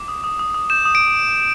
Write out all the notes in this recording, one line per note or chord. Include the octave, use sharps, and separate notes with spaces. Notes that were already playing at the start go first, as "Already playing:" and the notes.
Already playing: D6
D#6
D#6
D#6
D#6
G6 E7
D#6
D7